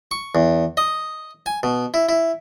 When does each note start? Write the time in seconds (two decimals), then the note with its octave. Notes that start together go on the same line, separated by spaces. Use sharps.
0.11 C#6
0.35 E2
0.77 D#5
1.46 G#5
1.63 B2
1.94 E4
2.09 E4